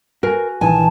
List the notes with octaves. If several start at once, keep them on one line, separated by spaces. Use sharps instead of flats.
F#4 G#4 A#4
A#1 D#3 E3 G#5 A5